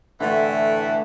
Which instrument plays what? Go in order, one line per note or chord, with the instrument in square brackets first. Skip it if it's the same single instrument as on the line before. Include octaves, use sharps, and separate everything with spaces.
[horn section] A2 E3 [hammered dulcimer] D3 A3